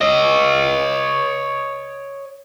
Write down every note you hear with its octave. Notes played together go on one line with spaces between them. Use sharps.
C#5 D#5